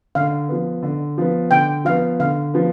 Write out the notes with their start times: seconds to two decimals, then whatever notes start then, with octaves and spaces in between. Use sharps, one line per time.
0.15 D3 F5
0.49 F3 B3
0.83 D3
1.18 F3 B3
1.51 D3 G5
1.85 F3 B3 F5
2.20 D3 F5
2.54 F3 B3